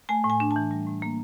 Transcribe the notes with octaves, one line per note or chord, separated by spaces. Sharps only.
A3 G#5
A2
G#5
D4
A5
E3
G3
A2
A#3